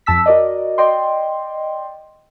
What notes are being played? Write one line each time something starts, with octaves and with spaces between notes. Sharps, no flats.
F2 A5 E6 B6
F#4 A#4 D5 D#5
D5 D#5 G5 C6